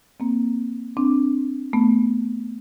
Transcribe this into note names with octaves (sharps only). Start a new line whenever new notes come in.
A#3 C4
C4 D4
A3 B3